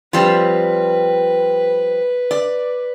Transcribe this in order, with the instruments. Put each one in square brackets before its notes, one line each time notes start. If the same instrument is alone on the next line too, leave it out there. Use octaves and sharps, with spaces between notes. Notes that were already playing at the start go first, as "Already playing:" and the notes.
[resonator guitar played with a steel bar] F3 G3 C4 [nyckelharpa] B4
[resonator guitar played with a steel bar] D5